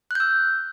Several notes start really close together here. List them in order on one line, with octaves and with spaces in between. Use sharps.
F#6 G6 E6